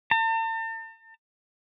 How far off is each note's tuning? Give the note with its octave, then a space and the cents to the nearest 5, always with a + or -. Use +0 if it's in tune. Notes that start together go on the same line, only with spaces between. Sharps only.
A5 +45